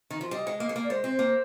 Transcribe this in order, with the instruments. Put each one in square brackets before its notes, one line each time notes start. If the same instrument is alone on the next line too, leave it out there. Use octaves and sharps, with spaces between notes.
[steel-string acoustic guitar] D#3
F3
[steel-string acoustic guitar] G3 [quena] D#5
[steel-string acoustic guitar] G#3
A#3
G#3
A#3
[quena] D5
[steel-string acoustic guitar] G#3 [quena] C5
[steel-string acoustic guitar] C4
A#3